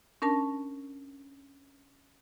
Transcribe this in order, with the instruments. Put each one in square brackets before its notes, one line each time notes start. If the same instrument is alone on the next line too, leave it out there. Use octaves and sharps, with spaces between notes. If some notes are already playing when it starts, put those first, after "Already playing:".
[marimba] C#4 D4 A#4 A5 C#6